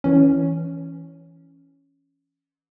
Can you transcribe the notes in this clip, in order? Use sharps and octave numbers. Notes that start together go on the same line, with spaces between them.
E3 C#4